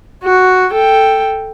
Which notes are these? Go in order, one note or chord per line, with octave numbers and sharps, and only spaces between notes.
F#4
A4 G5